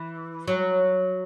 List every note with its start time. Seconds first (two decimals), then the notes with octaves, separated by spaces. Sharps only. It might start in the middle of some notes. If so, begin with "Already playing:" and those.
Already playing: E3
0.47 F#3